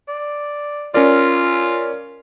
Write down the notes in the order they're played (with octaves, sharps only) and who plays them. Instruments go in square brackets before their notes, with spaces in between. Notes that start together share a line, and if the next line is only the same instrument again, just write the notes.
[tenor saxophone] D5
[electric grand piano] C#4 A#4 D5 [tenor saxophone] F4